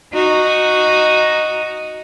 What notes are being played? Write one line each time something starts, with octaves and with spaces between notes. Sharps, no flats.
D#4 F#4